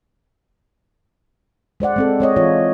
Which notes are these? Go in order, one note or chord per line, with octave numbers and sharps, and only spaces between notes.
G#3 C5 D5 F#5
G#3 C4 A4
G#3 C#5 D#5
E3 F4 C#5